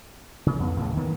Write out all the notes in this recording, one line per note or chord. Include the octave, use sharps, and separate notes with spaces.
C#3
F2 B3
D#2 A2 C#3
D#3 E3 A#3 B3